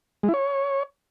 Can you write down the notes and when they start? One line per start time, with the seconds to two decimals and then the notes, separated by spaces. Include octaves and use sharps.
0.23 G#3
0.29 E4
0.34 C#5